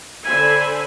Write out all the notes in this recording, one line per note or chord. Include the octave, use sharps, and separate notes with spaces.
D3 C5 G#5 B5